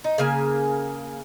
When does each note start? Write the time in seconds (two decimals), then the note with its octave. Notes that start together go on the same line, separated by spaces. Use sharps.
0.04 D#4
0.18 C#3 A#3 G#5